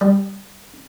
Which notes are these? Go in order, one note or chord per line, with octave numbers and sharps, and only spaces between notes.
G3